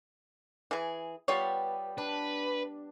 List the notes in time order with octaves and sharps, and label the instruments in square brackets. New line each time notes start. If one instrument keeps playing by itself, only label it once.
[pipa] E3 G#4
[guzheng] G3 B3 G4 [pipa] F4 C#5
[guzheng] D4 [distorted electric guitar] B4